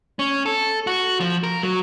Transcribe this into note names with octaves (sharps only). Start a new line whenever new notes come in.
C#4
A4
F#4
F3
A#4
F#3